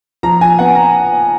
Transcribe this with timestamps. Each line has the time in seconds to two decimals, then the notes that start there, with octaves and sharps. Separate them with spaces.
0.23 F3 A#5
0.41 G#5
0.58 B3 F#5
0.75 A#5